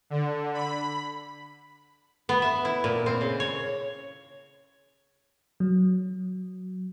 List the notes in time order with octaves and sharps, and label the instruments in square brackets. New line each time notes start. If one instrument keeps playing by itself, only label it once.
[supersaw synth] D3
B5
[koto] B3
E5
E4
A#2
C4
C#3
C#5
[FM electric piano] F#3